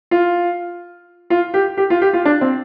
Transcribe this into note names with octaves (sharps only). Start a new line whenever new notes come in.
F4
F4
G4
G4
F4
G4
F4
D4
C4